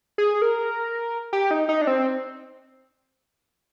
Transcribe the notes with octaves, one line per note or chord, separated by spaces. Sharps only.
G#4
A#4
G4
D#4
D#4
D4
C4